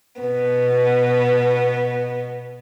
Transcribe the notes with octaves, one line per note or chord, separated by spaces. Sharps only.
B2 B3